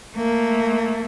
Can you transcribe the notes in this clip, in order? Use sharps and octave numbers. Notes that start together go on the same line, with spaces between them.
A3 A#3